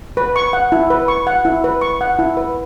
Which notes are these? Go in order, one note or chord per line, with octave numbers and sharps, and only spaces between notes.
B4
C#6
F#5
E4
B4
C#6
F#5
E4
B4
C#6
F#5
E4
B4